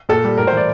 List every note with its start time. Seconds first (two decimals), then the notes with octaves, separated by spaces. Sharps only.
0.09 A#2 A4
0.24 G3
0.38 A2 A#4
0.47 C5
0.52 E3 D5